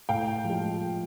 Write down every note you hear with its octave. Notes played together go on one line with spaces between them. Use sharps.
A2 F5 G5
F3 G#3